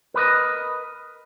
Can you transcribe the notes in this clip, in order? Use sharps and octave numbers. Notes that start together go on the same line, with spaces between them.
A#4 B4 D5 D#5